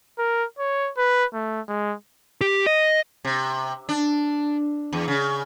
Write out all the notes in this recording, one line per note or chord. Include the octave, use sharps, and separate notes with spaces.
A#4
C#5
B4
A3
G#3
G4
D#5
C3
D4
E2
C#3